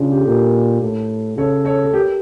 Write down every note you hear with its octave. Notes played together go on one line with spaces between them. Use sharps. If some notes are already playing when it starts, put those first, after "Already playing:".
Already playing: C#3 D4 F4
G4
A4
A#2 G4 A#4
A2
C#3 A4 C#5
A4 C#5
A4
G4 A#4